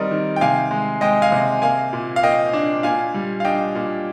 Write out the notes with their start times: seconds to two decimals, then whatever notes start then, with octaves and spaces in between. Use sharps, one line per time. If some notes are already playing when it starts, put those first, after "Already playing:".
Already playing: D#3 G3 C4 A#4 D5 D#5
0.11 D#3
0.36 G5
0.41 C3 F5 G#5
0.71 G#3
1.01 G#3 D#5 G5
1.22 F5 G#5
1.32 C3
1.62 A#3 F5 G#5
1.93 A#2
2.16 F5
2.23 A#3 D#5 G5
2.53 D4
2.83 A#2 F5 G#5
3.14 G3
3.40 F5
3.44 D4 D#5 G5
3.75 A#2